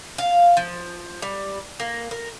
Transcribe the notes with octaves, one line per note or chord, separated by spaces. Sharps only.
F5
F3
G3
A#3
A#4